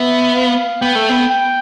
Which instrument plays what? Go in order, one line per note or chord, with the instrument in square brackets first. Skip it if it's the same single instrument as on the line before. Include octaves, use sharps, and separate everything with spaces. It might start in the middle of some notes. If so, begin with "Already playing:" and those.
Already playing: [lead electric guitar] B3 [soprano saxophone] E5
[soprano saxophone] F5
[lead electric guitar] B3 [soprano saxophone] G5
[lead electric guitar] A3
B3
[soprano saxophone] G5